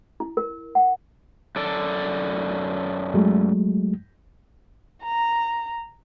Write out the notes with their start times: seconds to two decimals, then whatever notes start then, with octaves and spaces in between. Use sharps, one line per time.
0.20 E4
0.37 A#4
0.75 F#5
1.56 F#2 A4 D5
3.14 F#3 G#3 A3
5.03 A#5